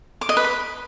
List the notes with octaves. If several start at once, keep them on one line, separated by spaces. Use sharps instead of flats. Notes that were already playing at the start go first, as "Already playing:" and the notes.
D6
D#5
B4
B5